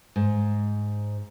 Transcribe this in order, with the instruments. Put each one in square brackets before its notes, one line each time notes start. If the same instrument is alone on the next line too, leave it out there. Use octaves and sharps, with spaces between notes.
[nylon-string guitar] G#2